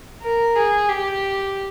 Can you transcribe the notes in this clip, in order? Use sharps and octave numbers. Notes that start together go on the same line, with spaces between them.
A#4
G#4
G4